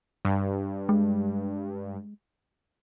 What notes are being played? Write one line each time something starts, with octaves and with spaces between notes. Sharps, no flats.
G2
G#3